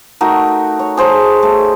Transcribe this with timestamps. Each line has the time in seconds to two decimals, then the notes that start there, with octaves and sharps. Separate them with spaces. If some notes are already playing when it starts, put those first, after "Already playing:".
0.21 A3 D#4 F#4 A#4
0.79 C#5
0.97 G#4 C5 C#5 A5
1.42 A3